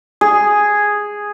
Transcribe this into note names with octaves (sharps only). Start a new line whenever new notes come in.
G#4